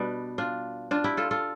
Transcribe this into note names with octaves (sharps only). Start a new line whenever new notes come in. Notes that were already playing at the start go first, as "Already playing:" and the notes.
Already playing: B2 G3 B3 D4
D4 F4
D4 F4
E4 G4
F4 A4
F4 A4